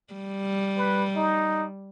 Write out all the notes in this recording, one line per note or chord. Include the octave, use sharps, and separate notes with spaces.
G3
B4
D#4